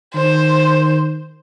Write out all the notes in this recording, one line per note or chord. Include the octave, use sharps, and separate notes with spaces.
D#3 C5